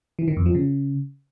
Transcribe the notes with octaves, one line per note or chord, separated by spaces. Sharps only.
E3
D#3
F2
F3
C#3